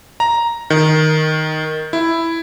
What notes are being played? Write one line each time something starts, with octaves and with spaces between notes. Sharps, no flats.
A#5
D#3
E4